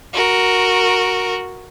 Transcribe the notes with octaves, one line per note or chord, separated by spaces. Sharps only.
F#4 A#4